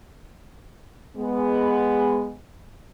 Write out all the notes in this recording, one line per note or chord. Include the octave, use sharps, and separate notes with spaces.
G#3 B3